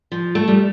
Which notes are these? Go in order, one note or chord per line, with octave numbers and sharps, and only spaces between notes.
F3
A3
G3